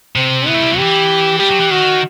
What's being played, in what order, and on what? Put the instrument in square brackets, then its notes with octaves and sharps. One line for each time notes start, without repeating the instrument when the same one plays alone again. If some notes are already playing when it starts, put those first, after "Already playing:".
[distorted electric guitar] C3 [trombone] C4
[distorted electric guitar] B3 [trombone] E4
[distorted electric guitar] A3
G3
F#3
[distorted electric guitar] E3 [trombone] G4
[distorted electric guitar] G3 [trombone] G4
[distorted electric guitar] F#3
E3
[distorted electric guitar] D#3 [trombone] F#4